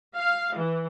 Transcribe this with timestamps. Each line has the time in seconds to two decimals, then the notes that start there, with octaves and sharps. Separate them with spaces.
0.17 F5
0.57 E3